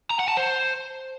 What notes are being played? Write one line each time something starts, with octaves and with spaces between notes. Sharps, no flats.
A#5
F#5
A5
C5